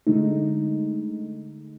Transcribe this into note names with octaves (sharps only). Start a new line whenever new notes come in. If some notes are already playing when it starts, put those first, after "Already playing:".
D3 G#3 A3 D#4